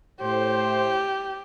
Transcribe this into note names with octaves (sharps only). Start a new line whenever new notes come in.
A2 G4 C5